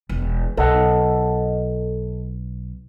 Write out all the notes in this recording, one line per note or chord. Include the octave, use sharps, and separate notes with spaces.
E1
B1 A4 D#5 F#5